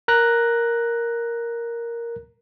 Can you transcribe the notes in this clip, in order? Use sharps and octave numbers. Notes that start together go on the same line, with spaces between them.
A#4 A#5 F#6 A#6